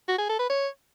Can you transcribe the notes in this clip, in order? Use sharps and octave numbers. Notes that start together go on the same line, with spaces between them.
F#4
G#4
A4
B4
C#5